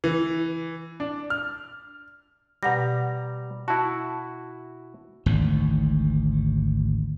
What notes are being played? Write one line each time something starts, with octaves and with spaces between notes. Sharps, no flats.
E3
D4
F6
B2 G3 F#5 A#5 A#6
E4 F#4 A5
G#1 D2 G#2